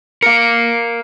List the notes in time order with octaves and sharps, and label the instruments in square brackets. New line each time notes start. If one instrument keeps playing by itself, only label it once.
[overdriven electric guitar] A#4 F5 [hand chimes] C#7